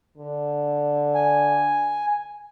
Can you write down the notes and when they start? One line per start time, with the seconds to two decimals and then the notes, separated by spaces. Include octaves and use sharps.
0.18 D3
1.15 G#5